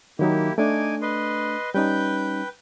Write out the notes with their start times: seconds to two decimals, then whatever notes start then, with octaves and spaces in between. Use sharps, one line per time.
0.19 D#3 F#3 A#3 D#4 E4 G4
0.58 A3 D4 D#4 G#5 D6
1.02 B4 D#5 C6
1.74 G3 C#4 D#4 B4 G5 G6